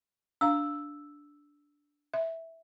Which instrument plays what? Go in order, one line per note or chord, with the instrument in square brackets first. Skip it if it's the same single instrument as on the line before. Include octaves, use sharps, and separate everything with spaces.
[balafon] D4 F5 A#5 [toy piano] E6
[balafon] E5